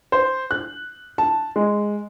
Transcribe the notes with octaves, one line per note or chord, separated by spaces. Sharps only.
C5
F#6
A5
G#3